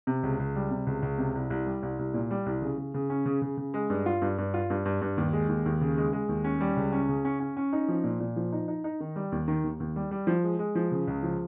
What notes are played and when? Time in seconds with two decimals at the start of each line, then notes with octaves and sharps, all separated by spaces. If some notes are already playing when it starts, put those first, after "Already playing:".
0.07 C3
0.23 C#2
0.39 C#2
0.55 G3
0.71 C3
0.87 C#2
1.03 C#2
1.18 C3
1.35 C2
1.50 C2
1.67 G3
1.83 C2
1.99 C2
2.14 A#2
2.31 G3
2.46 C2
2.62 C#3
2.78 C#3
2.94 C#3
3.10 C#4
3.26 C#3
3.42 C#3
3.57 C#3
3.74 G#3
3.90 G2
4.06 F4
4.22 G2
4.38 G2
4.54 F4
4.70 G2
4.85 G2
5.02 G2
5.17 D#2
5.33 G#3
5.49 D#2
5.66 D#2
5.81 C#3
5.97 G#3
6.13 G#3
6.29 D#2
6.44 C#4
6.61 G3
6.77 C#2
6.92 C#4
7.09 C#3
7.25 C#4
7.40 C#4
7.57 C#4
7.73 D#4
7.88 F3
8.04 A#2
8.20 A#2
8.36 F3
8.52 D#4
8.68 D#4
8.84 D#4
9.00 D#3
9.16 G3
9.32 D#2
9.48 D#3
9.64 D#2
9.80 D#2
9.96 G3
10.11 G3
10.27 F3
10.44 G#3
10.59 G#3
10.75 F3
10.92 C#3
11.07 C#2
11.23 F3